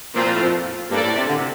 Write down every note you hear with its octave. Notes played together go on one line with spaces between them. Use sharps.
A#2 F3 C4 F4 C5
A#2
A2
F2
G2 A#3 D4 A4 D5
A2
C3
D3
C3